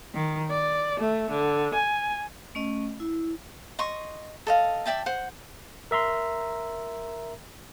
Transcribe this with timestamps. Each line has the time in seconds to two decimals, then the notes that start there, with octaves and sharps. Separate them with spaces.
0.13 D#3
0.50 D5
0.99 A3
1.30 D3
1.73 G#5
2.55 A3 C#4 D#5
3.00 E4
3.79 D#5 C6 C#6
4.47 A4 D#5 F5
4.86 D5 E5 G5 A5
5.06 C5 F#5
5.91 A#4 E5 A#5 C6